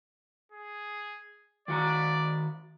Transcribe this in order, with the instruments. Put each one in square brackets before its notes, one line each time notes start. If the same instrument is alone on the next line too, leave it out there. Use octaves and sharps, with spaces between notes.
[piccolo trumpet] G#4
[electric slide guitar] D#3 F#4 A#5 [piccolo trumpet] D5